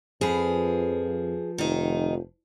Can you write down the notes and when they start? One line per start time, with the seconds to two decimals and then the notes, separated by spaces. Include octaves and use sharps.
0.21 F2 F3 G#4 B4
1.58 F1 D#3 D#4